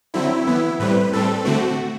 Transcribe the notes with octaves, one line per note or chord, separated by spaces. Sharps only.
D3 F#3 C4 E4
E3 B3
A2 G3 C4 B4
A2 G3 C4 A4
D3 A3 C4 F#4